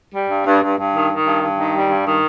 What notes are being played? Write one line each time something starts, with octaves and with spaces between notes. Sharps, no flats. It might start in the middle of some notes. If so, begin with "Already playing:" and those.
G3
G2
G2
G2
G2
D#3
D#3
G2
G2
D#3
G3
G2
D#3